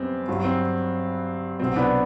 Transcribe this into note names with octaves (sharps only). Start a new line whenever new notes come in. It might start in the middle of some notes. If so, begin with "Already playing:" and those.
Already playing: F#2 G3 B3 C4
G2 F#3
C4
C2 B2 F#3 C4
B3 D4